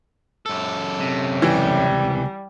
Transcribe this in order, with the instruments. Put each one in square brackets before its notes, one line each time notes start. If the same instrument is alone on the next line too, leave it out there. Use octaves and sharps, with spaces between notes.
[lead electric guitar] F#2 A4
[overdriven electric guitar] C3
[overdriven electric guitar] C#2 C3 [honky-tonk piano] E3 [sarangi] G3